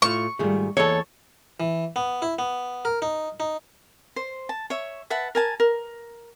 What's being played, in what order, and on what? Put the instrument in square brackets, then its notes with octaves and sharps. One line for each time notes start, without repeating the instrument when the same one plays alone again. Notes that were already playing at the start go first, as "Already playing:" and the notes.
[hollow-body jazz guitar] A2 A3 F4 [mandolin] C#6
[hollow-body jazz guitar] G#2 D#3 A3 [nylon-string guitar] G3 F4 G#4
[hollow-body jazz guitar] E2 A#3 D#5 [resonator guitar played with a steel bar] A4 C#5 [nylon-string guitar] A5
[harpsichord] E3
B3
E4
B3
A#4
D#4
D#4
[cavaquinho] C5
A5
C#5 E5
B4 E5 F#5 A5
A#4 G#5 A5
A#4